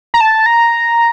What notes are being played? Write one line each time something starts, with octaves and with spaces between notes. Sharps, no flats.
A#5
A5
A#5